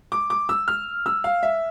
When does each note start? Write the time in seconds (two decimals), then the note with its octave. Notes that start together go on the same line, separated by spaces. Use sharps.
0.12 D6
0.30 D6
0.49 E6
0.68 F6
1.06 E6
1.24 F5
1.43 E5